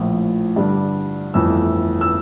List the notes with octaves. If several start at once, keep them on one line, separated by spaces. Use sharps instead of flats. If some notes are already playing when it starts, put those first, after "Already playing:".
Already playing: A#1 A2 F3
G2 D3 G3 D4
G1 F2 E3 A3 E6
E6